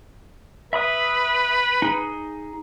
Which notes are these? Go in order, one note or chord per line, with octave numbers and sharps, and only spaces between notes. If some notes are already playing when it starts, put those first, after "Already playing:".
B4 E5 B5 D#6
D#4 G#4